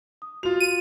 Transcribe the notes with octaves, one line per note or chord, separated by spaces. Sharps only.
D#6
F4 F#4 F7
D#7